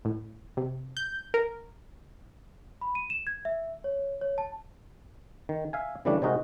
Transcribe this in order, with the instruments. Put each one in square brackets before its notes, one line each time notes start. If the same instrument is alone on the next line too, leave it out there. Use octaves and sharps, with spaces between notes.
[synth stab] A2
C3
G6
A#4
[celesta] B5
D#7
E7
G#6
E5
C#5
C#5
A5
[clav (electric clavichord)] D#3
E5 F5 G#5
C#3 E3 G3 A3 D4
C3 G#3 D#4 F#4 A#4